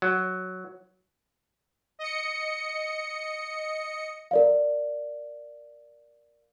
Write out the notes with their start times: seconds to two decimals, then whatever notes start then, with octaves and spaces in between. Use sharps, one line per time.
0.02 F#3
1.99 D#5 C#7
4.31 A#4 D5 F5